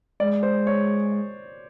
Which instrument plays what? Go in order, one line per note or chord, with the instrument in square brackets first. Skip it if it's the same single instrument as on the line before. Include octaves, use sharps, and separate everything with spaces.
[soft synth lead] G#3 [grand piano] D5
[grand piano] C5
C#5